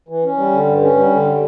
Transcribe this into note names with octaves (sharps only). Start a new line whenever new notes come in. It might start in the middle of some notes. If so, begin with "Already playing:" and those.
E3
C#4
G3
D3
G2
C#4
G3
D3